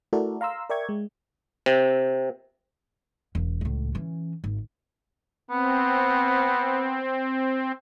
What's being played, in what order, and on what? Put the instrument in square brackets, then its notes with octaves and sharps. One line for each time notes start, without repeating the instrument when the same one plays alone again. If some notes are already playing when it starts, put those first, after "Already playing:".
[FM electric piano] A3 E4 F#4 A4 A#4 D5
F5 A#5 C6 E6
A#4 D5 E5 G5 C#6 G#6
G#3
[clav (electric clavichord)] C3
[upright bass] E1
C#2 A2
E3 C#4
G#1
[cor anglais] B3 [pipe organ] C4